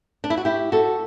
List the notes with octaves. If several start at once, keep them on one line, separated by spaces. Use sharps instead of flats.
D4
E4
F#4
E4 G4
F#4 A4